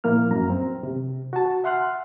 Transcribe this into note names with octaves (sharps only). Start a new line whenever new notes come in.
A#2 F3 A#3 E4 F6
F#2 A#5
C4
C3
F#4 A5
E5 F#5 C6 F6 F#6